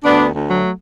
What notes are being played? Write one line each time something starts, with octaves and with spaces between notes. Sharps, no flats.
D2 B3 D4
D2
F#3 A3